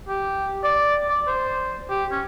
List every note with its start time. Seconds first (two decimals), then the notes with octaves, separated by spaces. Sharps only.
0.08 G4
0.64 D5
1.09 D5
1.27 C5
1.90 G4
2.11 C#4